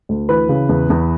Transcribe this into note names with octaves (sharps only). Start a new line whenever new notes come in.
D2
E3 B4
C#3
E2
E2